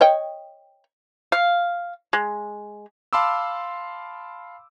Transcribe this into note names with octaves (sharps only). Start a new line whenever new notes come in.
C#5 D#5 G5
F5
G#3
F5 A5 B5 C6 D6 E6